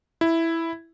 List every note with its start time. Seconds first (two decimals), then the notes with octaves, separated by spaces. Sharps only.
0.21 E4